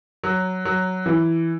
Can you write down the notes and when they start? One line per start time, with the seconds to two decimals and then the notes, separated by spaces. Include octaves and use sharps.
0.24 F#3
0.65 F#3
1.06 E3